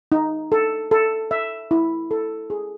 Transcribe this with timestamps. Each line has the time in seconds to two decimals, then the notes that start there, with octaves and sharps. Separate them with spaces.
0.12 D#4
0.52 A4
0.91 A4
1.31 E5
1.71 E4
2.11 A4
2.50 G#4